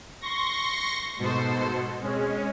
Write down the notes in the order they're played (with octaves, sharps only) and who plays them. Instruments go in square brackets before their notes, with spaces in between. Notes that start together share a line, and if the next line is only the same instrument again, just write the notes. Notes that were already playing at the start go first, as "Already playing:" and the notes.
[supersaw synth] C6 C#6 A#6
[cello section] G#2 A4 C5 [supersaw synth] B2
[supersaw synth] G#3 C#4 [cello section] C4